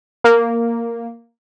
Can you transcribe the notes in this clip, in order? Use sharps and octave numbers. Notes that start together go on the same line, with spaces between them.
A#3